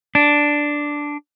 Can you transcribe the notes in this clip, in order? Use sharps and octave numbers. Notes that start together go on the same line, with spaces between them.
D4